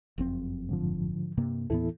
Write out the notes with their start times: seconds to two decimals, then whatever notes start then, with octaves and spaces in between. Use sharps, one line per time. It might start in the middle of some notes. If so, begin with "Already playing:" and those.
0.18 F#1 F2 C4
0.69 G#2 D3 F3
1.37 G2 C3 A#3
1.70 D#2 A2 E3 B3 E4 A4